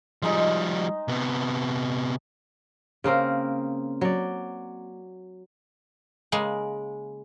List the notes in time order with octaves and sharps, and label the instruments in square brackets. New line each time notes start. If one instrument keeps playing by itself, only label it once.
[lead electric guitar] F3 G3 [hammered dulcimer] G#3 D#4
[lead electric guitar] C3 B3
[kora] C#3 A#3 C4 A#4
F#3 D5
[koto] C#3 G#3 A#3